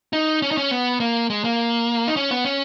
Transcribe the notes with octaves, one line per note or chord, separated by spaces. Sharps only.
D#4
C#4
D#4
C#4
B3
A#3
G#3
A#3
D#4
C#4
B3
C#4